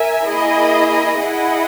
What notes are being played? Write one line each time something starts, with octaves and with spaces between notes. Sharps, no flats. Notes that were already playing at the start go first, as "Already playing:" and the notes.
Already playing: A#4 E5 G#5
A#3 E4 G#4 D#5
E4 G#4 D#5 F#5